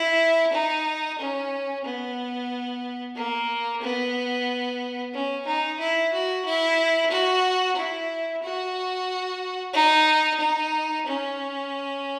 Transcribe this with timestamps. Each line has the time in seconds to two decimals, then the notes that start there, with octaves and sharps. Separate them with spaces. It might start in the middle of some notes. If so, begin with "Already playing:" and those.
Already playing: E4
0.53 D#4
1.19 C#4
1.85 B3
3.16 A#3
3.82 B3
5.14 C#4
5.47 D#4
5.80 E4
6.13 F#4
6.46 E4
7.11 F#4
7.77 E4
8.43 F#4
9.74 D#4
10.40 D#4
11.07 C#4